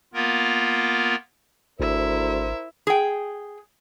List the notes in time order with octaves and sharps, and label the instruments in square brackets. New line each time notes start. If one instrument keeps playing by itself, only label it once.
[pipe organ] A#3 B3 F4 A#4
[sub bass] G#1 [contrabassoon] D2 [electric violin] E4 E5 [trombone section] A#4 C5
[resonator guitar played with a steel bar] G#4 G5